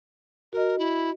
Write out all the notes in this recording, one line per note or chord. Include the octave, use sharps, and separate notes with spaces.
F#4 A#4 D#5
E4